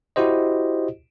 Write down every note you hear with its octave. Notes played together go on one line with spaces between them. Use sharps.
E4 F#4 G4 C5 D#5